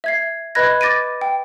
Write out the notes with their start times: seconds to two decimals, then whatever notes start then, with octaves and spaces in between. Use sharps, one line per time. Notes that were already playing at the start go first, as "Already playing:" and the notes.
0.04 E5 G#6 C7
0.55 B4 D#5 B5 F#6 G#6 A#6
0.81 D6 A6 A#6 D7 D#7
1.21 G5